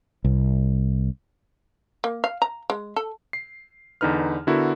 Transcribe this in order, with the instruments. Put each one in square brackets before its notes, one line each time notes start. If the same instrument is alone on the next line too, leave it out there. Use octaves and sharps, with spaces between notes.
[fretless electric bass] C2
[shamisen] A#3
F5
A#5
G#3
A4
[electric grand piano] C7
E2 D3 D#4 B4 F6
D3 B3 E4 F#4 A#4